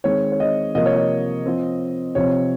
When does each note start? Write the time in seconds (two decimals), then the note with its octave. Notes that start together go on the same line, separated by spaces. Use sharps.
0.04 D#3 G#3 C4 C#5
0.32 C#5
0.40 D#5
0.75 C3 F3 A#3 D#5
0.86 C#5
0.96 D#5
1.46 F3 C4
2.15 C3 F3 C4 C#5